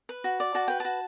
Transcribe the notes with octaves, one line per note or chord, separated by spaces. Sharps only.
B4
F#4
D5
F#4 A5
B4 G5
F#4 A5